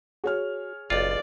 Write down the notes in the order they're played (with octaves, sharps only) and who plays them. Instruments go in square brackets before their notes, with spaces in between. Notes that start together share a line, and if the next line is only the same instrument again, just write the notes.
[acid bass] F#4 [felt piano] G#4 C#5 F6
[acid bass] F#1 [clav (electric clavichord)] B1 F4 [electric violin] D5